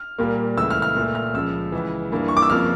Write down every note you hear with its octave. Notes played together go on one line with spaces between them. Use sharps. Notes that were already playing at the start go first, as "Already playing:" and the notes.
Already playing: F6
A#2 G3 A#3
C#2 C#3 E3 A3 E6
F6
F6
A#2 A3
F6
C#2 C#3 F3 E6
C#2 C#3 E3
G2 E3 A#3
C#6
D6
E6
F2 C#3 F3 A#3 F6